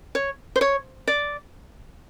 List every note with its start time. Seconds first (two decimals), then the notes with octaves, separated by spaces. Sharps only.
0.15 C#5
0.56 C5
0.61 C#5
1.08 D5